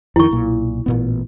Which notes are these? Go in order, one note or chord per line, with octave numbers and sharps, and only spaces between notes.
F2 D#3 E4 C#6
B1 A#2
A1 A#2 B3